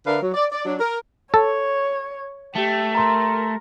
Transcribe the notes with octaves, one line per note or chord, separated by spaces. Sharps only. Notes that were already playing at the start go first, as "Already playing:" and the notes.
D3 D4 A#4 B4 E5 F5
F#3
D5
D5
F#3 D4
A#4
A4 C#5
A3 G4
A#4 A#5 C6